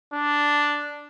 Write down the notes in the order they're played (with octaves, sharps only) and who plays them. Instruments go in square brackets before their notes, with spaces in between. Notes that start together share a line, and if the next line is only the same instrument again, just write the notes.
[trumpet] D4